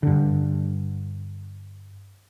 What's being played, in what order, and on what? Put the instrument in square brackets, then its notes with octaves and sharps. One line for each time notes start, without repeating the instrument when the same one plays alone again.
[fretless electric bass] G2 D3